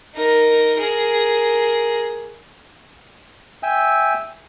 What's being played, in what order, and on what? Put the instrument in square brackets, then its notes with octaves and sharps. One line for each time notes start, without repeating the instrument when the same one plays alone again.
[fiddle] D#4 A#4
G#4 A#4
[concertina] E5 G5 G#5 E6